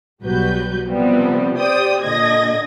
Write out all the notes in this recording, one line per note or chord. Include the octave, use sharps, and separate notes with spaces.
B1 F#3 G3 F#4 B4 G6
C3 F3 G3 B3 C4
G4 C5 D5 G5 D#6
A#2 D3 D#5 G#6 A#6